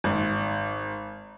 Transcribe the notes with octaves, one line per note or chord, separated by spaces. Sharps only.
G#1